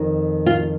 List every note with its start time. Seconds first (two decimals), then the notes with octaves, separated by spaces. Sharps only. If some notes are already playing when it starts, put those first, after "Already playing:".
Already playing: F2 D#3
0.46 F4